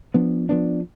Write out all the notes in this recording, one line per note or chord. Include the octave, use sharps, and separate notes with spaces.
F3 B3 D4
F3 B3 D4